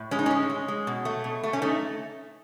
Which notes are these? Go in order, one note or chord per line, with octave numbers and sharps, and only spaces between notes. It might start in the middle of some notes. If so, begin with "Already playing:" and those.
Already playing: A2
G#3 C#4
D#4
G#3 C#4
G#3
G#3
B2
A3
B2
A3
C#4
A3 D#4